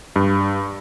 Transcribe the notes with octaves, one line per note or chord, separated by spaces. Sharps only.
G2